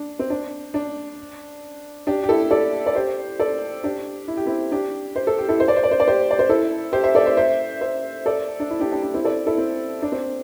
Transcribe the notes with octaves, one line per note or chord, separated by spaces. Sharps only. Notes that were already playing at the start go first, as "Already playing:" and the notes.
Already playing: D4
C4
D4
D4
D4 G4
G4
E4 A4
A4 D5
D5
G4 C5
A4 D5
D4 G4
E4
G4
C4 E4
D4 G4
C5
A4
G4
E4 A4
C5
D5
C5
D5
C5
D5
G4 C5
D5
C5
E4 A4
G4 C5
C5 E5
A4 D5
C5 E5
C5 E5
C5 E5
A4 D5
D4
E4
D4 G4
D4 G4
D4
C4 E4
A4 D5
E4 A4
C4
D4
C4